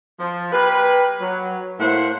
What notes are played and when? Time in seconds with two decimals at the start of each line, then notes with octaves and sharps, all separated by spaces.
0.19 F3
0.52 A#3 G4 B4
1.21 F#3
1.80 A2 A#3 E4 C5 F#5